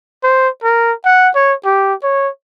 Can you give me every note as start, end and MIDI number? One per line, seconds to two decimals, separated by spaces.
0.23 0.48 72
0.64 0.93 70
1.05 1.29 78
1.35 1.54 73
1.65 1.94 67
2.03 2.29 73